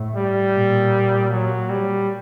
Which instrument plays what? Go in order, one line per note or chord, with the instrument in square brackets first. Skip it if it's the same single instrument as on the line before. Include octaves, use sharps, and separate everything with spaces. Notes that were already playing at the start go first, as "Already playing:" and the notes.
Already playing: [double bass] A2
[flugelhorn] G3
[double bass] A#2
[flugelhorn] F#3
G3